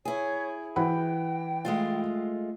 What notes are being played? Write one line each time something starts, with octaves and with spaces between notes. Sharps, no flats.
E4 G#4 C#5
E3 F#5 G5 B5
G#3 A3 F4